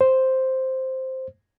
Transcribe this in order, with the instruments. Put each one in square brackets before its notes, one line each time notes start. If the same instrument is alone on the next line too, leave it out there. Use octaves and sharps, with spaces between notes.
[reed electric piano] C5